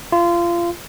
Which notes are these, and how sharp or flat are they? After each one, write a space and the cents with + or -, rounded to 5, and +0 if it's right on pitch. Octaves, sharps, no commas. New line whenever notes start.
F4 -25